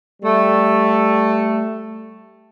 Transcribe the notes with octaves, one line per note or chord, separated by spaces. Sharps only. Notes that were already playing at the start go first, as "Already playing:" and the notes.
G3 A3